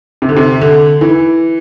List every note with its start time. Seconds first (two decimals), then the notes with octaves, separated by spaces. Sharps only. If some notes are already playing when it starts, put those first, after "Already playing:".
0.22 C3
0.29 D3
0.36 C3
0.61 D3
1.01 E3